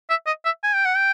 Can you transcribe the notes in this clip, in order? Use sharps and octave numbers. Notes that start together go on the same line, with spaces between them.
E5
D#5
E5
G#5
G5
F#5
G5